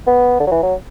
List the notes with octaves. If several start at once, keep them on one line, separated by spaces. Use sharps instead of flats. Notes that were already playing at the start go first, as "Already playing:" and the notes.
B3
D3
F#3
E3
F#3